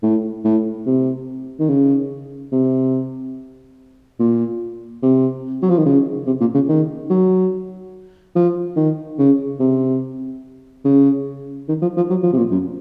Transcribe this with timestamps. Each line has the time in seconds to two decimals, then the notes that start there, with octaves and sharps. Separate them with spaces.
0.03 A2
0.44 A2
0.86 C3
1.59 D#3
1.69 C#3
2.52 C3
4.19 A#2
5.03 C3
5.62 F#3
5.69 F3
5.78 D#3
5.86 C#3
6.26 C3
6.40 A#2
6.54 C#3
6.69 D#3
7.10 F#3
8.35 F3
8.76 D#3
9.18 C#3
9.60 C3
10.85 C#3
11.68 D#3
11.82 F3
11.96 F3
12.10 F#3
12.23 F3
12.33 C3
12.38 A#2
12.51 F#2